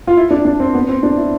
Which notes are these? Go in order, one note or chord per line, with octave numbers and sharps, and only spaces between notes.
F4
E4
D4
D4
C4
B3
C4
D4
E4